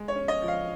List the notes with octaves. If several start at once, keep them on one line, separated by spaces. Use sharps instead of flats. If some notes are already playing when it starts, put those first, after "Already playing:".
Already playing: G#3
C#5
C#4
D#5
F3
F5